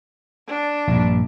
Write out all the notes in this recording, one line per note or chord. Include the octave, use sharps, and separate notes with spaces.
D4
A#1 G2